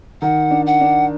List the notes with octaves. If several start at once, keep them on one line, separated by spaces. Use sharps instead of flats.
D#3 F#5
D4
F#5
D4